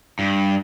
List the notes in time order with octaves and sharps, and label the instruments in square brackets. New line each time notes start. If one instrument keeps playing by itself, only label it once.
[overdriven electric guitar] G2